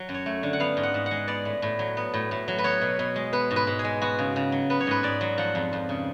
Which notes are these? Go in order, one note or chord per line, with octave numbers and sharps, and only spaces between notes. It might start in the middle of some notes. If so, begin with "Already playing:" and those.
Already playing: F#3
F#2
C#5
A3
D3
F#5
B3 F5
G#2
F#5
G#2
F#5
G#3
B3 D5
A2
A2
F#3
B3
A2
A2
F#3
B4
B3 C#5
B2
B2
G#3
B3 B4
G#2
B4
G#2
G#4
G#3
B3 F#4
C#3
C#3
F#3
B3 B4
C#5
G#2 B4
G#2 D5
F#3
F3 F#5
F2
F2
C#3